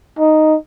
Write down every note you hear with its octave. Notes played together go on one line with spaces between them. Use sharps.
D#4